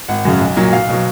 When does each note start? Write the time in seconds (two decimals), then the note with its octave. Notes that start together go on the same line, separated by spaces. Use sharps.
0.09 G#1 F#5
0.25 F#2 C#3
0.41 B1
0.57 A#2 F#3
0.73 B1 F5
0.89 B2 F#3